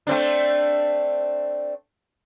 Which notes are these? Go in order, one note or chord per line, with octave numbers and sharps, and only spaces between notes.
A3 C4 D4